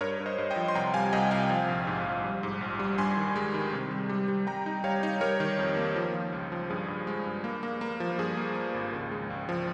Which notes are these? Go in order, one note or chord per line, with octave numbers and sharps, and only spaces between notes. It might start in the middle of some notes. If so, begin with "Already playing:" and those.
G2 A#4 C#5
G2
C5 D#5
G2
D#5 G5
F3
C6
C2 G5 A#5
G3 F5 G#5
C2 D#5 G5
C2 F5 G#5
F3
A#1
G#2
F3
G3
G#2
A#1
G3
G2 G#5 C6
D#3
G#3
D#3
C3
G3
G3
G3
G3 G5 A#5
D#4
G3 C#5 F5
D#4
G3 A#4 C#5
D#3
F2
A#3
F3
F3
C#2
F3
G2 G#4
G2
G#3
G2
A#3
A#3
A#3
F3
G2 G#4
A#3
A#3
G#1
C#2
G#3
C#2
F3